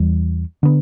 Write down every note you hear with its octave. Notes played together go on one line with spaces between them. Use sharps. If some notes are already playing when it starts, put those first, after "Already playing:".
Already playing: E2 E3 G3
D3 B3